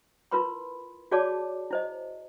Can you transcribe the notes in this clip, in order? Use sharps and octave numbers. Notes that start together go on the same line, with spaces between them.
E4 F4 A#4 B4 B5 C6
F#4 G#4 C#5 D5 A5 D6
E4 C5 D#5